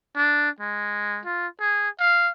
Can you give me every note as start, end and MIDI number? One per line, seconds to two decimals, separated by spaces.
0.16 0.49 62
0.60 1.20 56
1.25 1.47 65
1.61 1.89 68
2.00 2.30 77